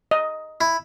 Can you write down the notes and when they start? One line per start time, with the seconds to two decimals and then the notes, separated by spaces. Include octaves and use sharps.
0.11 D#5
0.61 E4